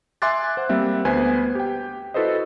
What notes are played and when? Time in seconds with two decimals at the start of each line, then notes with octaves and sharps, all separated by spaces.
0.22 E5 G#5 C6 D6 F#6 A6
0.57 C5 F#5
0.69 G3 A#3 C4 E5
1.05 D2 B3 B4 C5 G#5
1.55 G4 G5
2.14 E4 F#4 A4 B4 C5 D#5